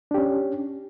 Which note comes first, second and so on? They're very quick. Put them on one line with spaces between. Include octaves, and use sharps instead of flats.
D4 G4 C#4